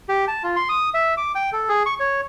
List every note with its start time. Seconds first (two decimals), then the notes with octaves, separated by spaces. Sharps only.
0.09 G4
0.28 A5
0.43 F4
0.56 C6
0.69 D#6
0.94 E5
1.17 D6
1.35 G5
1.52 A4
1.69 G#4
1.86 C#6
2.00 C#5